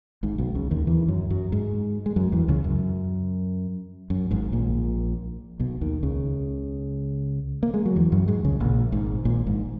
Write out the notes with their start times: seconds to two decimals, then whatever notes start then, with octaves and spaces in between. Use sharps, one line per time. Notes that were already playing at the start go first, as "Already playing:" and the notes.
0.23 G#1 G#2
0.38 B1 B2
0.55 C#2 C#3
0.71 D#2 D#3
0.87 E2 E3
1.08 F#2 F#3
1.30 F#2 F#3
1.52 G#2 G#3
2.06 G#3
2.16 F#2 F#3
2.32 E2 E3
2.48 C#2 C#3
2.64 F#2
4.10 F#2
4.31 G#1 G#2
4.52 A#1 A#2
5.59 B1 B2
5.81 D#2 D#3
6.03 C#2 C#3
7.63 A#3
7.74 G#3
7.86 F#3
7.96 E2 E3
8.12 F#2 F#3
8.28 G#2 G#3
8.45 C#2 C#3
8.60 A#1 A#2
8.92 G#1 G#2
9.25 A#1 A#2
9.46 G#1 G#2